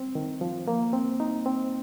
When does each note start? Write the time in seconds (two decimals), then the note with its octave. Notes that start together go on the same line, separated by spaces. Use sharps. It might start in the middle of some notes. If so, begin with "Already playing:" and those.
Already playing: C4
0.15 D#3
0.41 F3
0.68 A#3
0.93 C4
1.20 D#4
1.46 C4